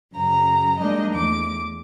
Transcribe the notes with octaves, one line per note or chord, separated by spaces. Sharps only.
F#2 C#3 A#5
G3 G#3 A#3 D4 D#4 D#5
E2 A3 D6